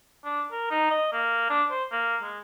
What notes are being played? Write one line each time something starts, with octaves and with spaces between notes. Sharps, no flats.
D4
A#4
D#4
D#5
A#3
D4
C5
A#3
G#3